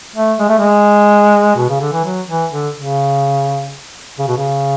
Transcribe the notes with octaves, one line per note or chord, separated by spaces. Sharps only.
A3
G#3
A3
G#3
B2
C#3
D3
E3
F#3
E3
D3
C#3
C#3
B2
C#3